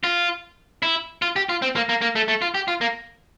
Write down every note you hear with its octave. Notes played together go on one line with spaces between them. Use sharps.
F4
E4
F4
G4
F4
C4
A#3
A#3
A#3
A3
A3
F4
G4
F4
A#3